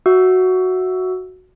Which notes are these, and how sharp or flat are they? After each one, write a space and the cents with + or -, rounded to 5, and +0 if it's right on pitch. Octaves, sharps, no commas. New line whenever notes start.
F#4 +0 E5 +0 E6 +0